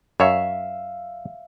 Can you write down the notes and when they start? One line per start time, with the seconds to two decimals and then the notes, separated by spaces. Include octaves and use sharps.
0.20 F#2 C#5 E5 F5